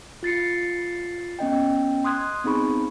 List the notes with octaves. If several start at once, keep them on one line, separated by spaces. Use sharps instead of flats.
F4 A6 C7 C#7
B3 C#4 D#5 G5
C6 D#6 F#6 G#6
B3 C4 D#4 G#4 B5 C#6